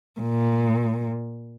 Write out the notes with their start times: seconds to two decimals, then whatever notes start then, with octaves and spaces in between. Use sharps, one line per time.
0.21 A#2